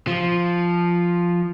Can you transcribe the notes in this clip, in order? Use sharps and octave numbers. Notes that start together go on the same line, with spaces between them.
F3